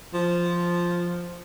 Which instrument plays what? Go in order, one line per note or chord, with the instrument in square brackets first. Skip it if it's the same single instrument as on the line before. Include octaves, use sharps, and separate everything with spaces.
[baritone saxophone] F3